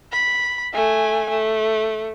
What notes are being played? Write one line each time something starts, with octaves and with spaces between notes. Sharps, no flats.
B5
A3 G#5
A3